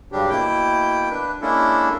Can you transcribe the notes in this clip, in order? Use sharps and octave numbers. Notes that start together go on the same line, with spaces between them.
G2 C#3 F#3 G3 D4 G4
B2 A#3 E4 G5 G6
D4 B4
G#3 A#3 C#4 D4 E4 A4